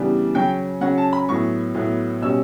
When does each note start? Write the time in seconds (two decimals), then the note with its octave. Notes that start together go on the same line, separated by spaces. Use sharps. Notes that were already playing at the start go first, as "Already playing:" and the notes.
Already playing: C#3 E3 G3 B3 D4
0.35 C#3 F#3 C#4 G5
0.81 C#3 F#3 C#4 F#5
0.98 A5
1.13 B5
1.29 A2 F#3 B3 C#6
1.75 A2 F#3 B3
2.21 B2 G3 C#4 E6